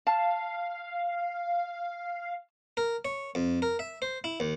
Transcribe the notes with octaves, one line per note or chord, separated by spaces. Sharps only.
F5 A5
A#4
C#5
F2
A#4
E5
C5
E4
D#2